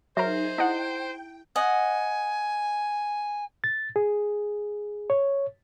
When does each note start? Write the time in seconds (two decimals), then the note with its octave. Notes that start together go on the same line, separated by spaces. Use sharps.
0.17 F#3 D#4 G#4 A#4 C5 E5
0.58 E4 D#5 F#5 G5
1.56 D#5 F#5 G#5
3.64 A6
3.96 G#4
5.10 C#5